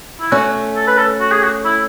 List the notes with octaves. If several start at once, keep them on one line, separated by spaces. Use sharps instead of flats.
E4
A3 C#4 F#4
A4
B4
A4
F#4
G#4
F#4
E4